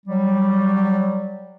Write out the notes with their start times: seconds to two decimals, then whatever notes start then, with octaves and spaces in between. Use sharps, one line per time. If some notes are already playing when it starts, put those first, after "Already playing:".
0.06 F#3 G3